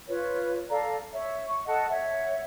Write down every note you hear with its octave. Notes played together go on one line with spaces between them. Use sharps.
F4 B4 C#5
A4 D5 F5 A#5
C#5 E5
C#6
A4 D#5 F#5 A5
C#5 E5 F#5